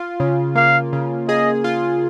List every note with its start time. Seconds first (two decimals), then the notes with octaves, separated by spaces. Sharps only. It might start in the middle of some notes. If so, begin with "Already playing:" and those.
Already playing: F4
0.20 C#3
0.55 A#3 F5
0.93 C#3
1.28 G#4 D#5
1.64 F4